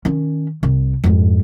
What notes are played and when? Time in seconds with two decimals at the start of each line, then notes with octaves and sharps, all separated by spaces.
0.05 D#3 C#4
0.63 C2 C3
1.04 F2 G#2